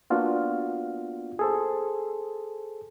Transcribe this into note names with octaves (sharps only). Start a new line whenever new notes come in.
A#3 B3 D4 F4 F#4
G#4 A4 C5